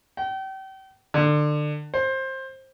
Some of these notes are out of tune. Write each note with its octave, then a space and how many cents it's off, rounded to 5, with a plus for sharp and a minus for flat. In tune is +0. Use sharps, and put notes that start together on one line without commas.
G5 -35
D3 +25
C5 +20